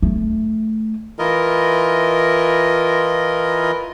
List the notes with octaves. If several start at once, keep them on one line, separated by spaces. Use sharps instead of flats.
A3
E3 E4 F4 A#4 D#5